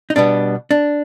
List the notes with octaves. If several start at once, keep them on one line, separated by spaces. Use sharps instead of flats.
D#4
B2 G3 B3 D4
D4